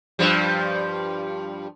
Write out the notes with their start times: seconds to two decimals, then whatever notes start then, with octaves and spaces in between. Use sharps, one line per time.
0.19 G2 F3 G3